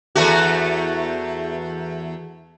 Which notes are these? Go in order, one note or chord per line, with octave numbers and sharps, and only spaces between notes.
E2 A3 F#4